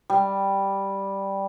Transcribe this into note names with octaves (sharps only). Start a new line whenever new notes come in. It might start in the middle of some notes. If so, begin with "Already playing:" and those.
G3